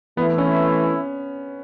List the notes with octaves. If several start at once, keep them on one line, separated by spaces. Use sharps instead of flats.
E3 A3 B3 E4
C#4